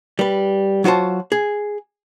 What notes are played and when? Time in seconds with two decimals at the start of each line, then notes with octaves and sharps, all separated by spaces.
0.19 G3 B4
0.84 F#3 F4 F#4 C5 A5
1.32 G#4